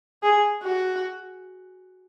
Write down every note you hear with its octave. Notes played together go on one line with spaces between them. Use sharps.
G#4
F#4